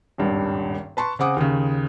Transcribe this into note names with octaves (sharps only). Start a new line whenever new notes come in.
D#1 G#1 G2 G3
B4 A5 C6 C#6
C#3 C4 G#4 F#5 D6 D#6
D#2 C#3